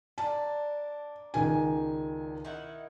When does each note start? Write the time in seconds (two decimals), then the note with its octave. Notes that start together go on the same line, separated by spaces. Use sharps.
0.18 A#3 D4 A5
1.34 C#2 D#3 G#5
2.45 D#3 E4 F#5